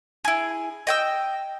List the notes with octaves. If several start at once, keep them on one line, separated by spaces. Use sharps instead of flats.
E4 G#4
D#5 G5 E6